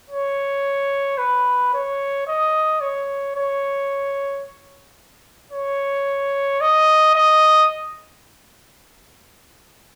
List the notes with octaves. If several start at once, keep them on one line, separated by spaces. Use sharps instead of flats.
C#5
B4
C#5
D#5
C#5
C#5
C#5
D#5
D#5